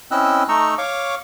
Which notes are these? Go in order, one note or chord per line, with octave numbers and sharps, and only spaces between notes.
C4 C#4 E4 D#5 E6 F#6
A3 D#4 D#5 A#5 C#6 E6
C#5 F5 C#6 D6